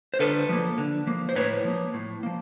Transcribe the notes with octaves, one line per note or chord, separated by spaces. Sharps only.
C5
D3 A4 B4
F3 A#3
D3
F3 A#3
C5
A2 B4 C#5
F3 A#3
A2
F3 A#3